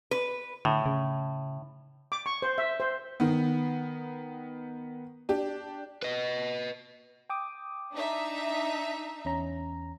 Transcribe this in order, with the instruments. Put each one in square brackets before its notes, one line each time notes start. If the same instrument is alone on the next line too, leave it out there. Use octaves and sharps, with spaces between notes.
[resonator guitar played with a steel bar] B4
[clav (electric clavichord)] A2 [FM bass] D3
[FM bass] C#3
[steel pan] D6
C#6
C5
E5
C5
[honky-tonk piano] D#3 B3
D4 G4
[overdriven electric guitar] B4 D#5
[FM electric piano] G5 D6 D#6
[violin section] D4 D#4 E5
[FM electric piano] E2 C#4 A#5